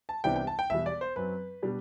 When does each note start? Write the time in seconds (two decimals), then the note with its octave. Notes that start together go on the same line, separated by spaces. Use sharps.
0.09 A5
0.24 C2 C3 E3 B3 D4 G5
0.36 G5
0.47 A5
0.59 G5
0.70 E1 E2 B2 G3 E5
0.86 D5
1.01 C5
1.16 F#2 F#3 C4 B4
1.62 B2 G3 D4